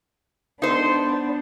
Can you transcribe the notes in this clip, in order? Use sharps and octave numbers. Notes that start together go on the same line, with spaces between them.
B3 D4 D#4 C5